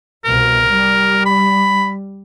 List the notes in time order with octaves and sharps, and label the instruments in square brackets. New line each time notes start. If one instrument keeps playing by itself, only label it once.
[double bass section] C2 B2 [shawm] A#4
[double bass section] G3
[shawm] B5